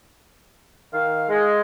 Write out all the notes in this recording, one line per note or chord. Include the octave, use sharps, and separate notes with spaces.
D#3 F5
G#3